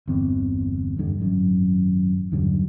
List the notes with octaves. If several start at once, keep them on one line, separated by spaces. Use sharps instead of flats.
G1 E2 B3 C4
E2 G2 D3
G#1 F#2
E2 G2 D3 F#3